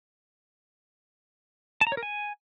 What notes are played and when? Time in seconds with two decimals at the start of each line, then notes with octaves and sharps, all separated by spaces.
1.81 A5
1.87 A#5
1.92 C#5
1.97 A#4
2.03 G#5